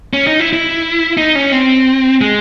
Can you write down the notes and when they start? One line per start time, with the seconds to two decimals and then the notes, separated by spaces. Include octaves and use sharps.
0.13 C#4
0.27 D#4
0.40 E4
0.53 E4
1.17 D#4
1.35 C#4
1.52 C4
2.21 G#3